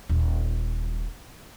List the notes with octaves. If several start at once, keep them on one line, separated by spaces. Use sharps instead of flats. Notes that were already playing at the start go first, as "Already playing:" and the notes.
D#1